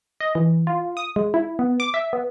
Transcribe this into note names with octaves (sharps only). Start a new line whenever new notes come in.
D#5
E3
F4
D#6
G#3
E4
B3
D6
E5
B3